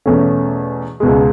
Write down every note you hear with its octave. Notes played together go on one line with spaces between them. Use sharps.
E2 B2 A3 C#4
C#2 B2 G#3